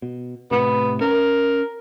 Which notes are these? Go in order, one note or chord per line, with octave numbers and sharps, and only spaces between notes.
B2
A2 C3 B3
C#4 A#4